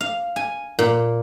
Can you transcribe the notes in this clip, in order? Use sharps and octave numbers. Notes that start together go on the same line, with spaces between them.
F5
G#5
A#2